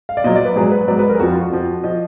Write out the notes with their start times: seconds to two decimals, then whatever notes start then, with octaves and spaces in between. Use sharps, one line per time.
0.09 F5
0.17 D5
0.24 A#2 F#3 D#5
0.36 D5
0.45 B4
0.56 G#2 F#3 G#4
0.72 B4
0.88 G#2 F#3 D5
0.99 B4
1.09 A#4
1.15 G#4
1.20 F2 F3 F#4
1.31 F4
1.41 F#4
1.52 F2 F3
1.84 F3 D#5